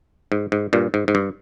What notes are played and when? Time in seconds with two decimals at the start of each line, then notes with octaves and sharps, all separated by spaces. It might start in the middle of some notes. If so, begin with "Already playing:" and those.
0.32 G#2
0.52 G#2
0.73 G2 A#2
0.94 G#2
1.08 G#2
1.15 G2